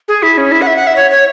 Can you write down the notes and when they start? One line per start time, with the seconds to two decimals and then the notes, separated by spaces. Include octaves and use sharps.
0.08 G#4
0.23 E4
0.38 C#4
0.52 E4
0.62 F#5
0.67 E5
0.76 F#5
0.87 E5
0.96 C#5
1.11 C#5